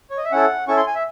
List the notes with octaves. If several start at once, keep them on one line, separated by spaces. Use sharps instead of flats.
C#5
D#5
E5
C#4 E4 A4 F#5
C#4 E4 A4 C#6
C6
G#5
E5